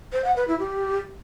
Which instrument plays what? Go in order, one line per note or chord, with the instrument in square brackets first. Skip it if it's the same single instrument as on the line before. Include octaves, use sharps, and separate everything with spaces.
[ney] C5
F#5
B4
E4
G4